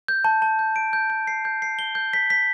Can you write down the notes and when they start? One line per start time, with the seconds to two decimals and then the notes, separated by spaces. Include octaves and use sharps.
0.08 G6
0.25 A5
0.42 A5
0.59 G6
0.76 D7
0.93 G6
1.10 G6
1.27 C7
1.45 G6
1.62 C7
1.79 G7
1.95 G6
2.13 B6
2.30 B6